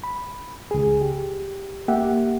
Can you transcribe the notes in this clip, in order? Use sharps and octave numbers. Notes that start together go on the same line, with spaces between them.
B5
C#2 G#4
G4
A#3 G4 E5 F#5